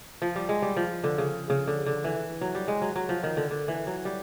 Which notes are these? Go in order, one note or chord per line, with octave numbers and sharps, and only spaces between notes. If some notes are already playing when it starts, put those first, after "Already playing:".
F3
G3
G#3
G3
F3
D3
C#3
C#3
D3
D3
E3
F#3
G3
G#3
F#3
F#3
F3
D#3
D3
D3
E3
F#3
G3